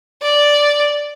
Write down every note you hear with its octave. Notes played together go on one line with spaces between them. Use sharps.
D5